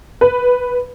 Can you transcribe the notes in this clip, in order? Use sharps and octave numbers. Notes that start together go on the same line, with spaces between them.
B4